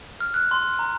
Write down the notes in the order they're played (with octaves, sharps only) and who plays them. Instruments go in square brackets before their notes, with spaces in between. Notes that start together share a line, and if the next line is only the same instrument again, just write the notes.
[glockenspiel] F6
F#6
C6
A#5